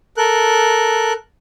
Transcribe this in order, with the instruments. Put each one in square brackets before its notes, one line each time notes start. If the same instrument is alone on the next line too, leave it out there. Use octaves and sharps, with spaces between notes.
[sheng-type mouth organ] A4 A#4 F#6